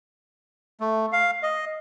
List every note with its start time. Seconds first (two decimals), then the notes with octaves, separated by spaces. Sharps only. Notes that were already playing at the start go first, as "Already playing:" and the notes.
0.80 A3
1.12 F5
1.43 D#5